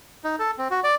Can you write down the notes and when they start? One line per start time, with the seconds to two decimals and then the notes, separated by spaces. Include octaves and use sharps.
0.24 D#4
0.39 A4
0.58 C4
0.71 F#4
0.84 D5